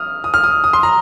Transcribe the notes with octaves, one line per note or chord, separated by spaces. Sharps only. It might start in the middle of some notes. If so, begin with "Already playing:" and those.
Already playing: D#6 F6
D#6
F6
D#6
D#6
C6
A#5